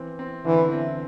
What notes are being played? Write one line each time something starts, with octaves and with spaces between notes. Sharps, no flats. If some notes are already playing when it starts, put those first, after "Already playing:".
Already playing: E3 C4
C4
D3 E3
C4